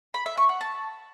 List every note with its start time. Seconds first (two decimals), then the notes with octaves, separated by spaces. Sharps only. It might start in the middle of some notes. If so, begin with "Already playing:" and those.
0.14 B5
0.26 E5
0.37 C#6
0.49 F#5
0.61 A5